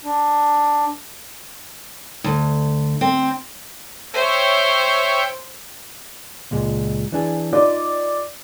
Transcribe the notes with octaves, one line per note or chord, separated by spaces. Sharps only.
D4
D2
C4
C5 C#5 E5 G5
C#2 A#2 G#3
E3 D4 G#4
D#4 F4 D5